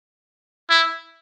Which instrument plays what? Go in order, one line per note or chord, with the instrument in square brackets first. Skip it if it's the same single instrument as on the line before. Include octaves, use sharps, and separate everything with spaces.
[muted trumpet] E4